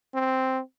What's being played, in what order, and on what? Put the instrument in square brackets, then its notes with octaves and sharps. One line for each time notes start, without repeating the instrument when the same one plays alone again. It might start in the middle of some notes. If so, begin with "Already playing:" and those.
[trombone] C4